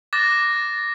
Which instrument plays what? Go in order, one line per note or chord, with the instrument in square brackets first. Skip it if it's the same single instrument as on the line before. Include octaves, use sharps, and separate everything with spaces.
[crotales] D6 F#6 A6 A#6